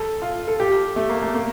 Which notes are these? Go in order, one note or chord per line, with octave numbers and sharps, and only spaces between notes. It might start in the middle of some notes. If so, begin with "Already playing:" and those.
Already playing: A4
F4
A4
G4
A3
A#3
A3
A#3